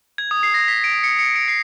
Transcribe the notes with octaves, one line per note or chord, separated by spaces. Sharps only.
G#6
D#6
C7
A#6
B6
D7
C#7
C#7
D7
C7